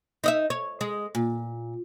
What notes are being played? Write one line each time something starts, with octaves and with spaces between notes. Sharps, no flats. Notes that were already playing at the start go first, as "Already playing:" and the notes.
D#4 D#5 E5
C#5
G#3
A#2